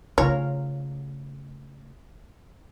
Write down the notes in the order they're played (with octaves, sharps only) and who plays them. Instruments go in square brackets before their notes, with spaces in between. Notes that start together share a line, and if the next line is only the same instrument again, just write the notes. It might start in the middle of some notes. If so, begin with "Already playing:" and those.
[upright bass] C#3 A3 [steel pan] C#4 F4 A#4 [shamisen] C#5